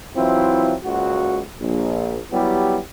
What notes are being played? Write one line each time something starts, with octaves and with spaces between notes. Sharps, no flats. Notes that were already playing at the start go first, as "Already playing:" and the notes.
E3 F#3 C4 E4 F4
C#2 A#2 F#4
A#1
F#3 G3 B3 E4 G4